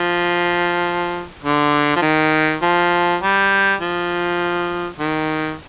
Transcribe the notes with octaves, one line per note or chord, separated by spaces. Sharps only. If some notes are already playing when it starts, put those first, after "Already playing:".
Already playing: F3
D3
F3
D#3
F3
G3
F3
D#3